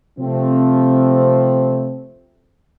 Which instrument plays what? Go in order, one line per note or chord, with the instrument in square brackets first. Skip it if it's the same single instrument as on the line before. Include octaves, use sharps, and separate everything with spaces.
[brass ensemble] C3 F3 A3 C4